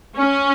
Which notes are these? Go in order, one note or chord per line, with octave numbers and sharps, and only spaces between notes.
C#4